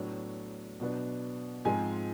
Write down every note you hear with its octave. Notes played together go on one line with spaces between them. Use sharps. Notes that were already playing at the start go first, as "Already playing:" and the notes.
Already playing: A2 F#3 B3 D4
B2 F#3 B3 D4
G#2 F3 G#3 C4 G#5